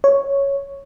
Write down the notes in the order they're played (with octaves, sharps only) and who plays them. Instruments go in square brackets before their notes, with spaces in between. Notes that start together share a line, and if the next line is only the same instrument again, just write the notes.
[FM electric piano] C#5